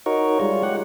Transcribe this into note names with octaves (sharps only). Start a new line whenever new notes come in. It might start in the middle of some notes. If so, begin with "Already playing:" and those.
D#4 F#4 A#4 C#5
G3 G#3 F4 C#5
G4 F#5